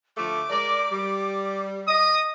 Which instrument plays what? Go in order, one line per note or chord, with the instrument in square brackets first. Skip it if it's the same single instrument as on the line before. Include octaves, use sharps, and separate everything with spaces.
[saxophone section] D3 F3 A3 [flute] D6
[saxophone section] G#3 A#4 D5
G3
[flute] D#5 [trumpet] D#6